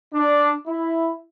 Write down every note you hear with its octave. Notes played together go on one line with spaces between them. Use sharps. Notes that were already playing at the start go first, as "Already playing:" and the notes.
D4
E4